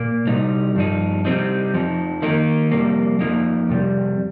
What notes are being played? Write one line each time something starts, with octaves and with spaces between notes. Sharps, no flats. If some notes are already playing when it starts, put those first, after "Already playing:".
Already playing: A#2 A#3
C3 G3 D#4
G2 F3 D#4
C3 G3 C4 D#4
F2 F3 D#4
D#3 A#3 D#4
F2 C3 G3 A#3
F2 F3 A#3 D#4
F2 C3 G3